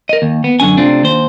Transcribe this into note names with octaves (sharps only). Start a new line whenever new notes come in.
A#4 D#5
D#2
B3
F#2 D3 C#4 G#5
C3 A3 C4 D4 F4
D#2 C5